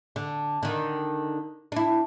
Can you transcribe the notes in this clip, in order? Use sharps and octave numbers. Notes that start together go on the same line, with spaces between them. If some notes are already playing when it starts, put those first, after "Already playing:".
D3
D3 D#3
D4 E4